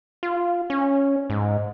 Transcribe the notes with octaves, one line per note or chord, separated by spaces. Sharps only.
F4
C#4
G#2